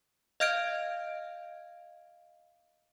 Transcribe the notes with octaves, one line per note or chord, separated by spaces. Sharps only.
D#5 F5 F6 G6 G#6 D7